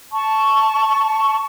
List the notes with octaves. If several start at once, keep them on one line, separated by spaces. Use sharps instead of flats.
A5 C#6